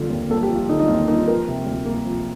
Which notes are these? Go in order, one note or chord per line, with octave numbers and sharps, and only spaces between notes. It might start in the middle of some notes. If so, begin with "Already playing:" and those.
Already playing: D3 F3 A#3 F4
D#2
A#3 A4
G4
F3
F4
D3 D#4
D#4
D#2 F4
A#3 D#4
F3 A#4
C3
D2
A#3
F3